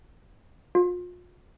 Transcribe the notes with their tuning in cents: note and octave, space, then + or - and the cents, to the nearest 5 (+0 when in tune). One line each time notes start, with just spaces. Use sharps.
F4 +35